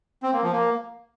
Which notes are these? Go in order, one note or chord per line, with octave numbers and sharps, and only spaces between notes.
C4
A#3
F3
A#3